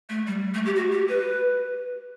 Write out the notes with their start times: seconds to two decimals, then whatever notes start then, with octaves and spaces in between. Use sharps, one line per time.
0.09 A3
0.27 G3
0.54 A3
0.66 G4
0.76 F#4
0.92 G4
1.09 B4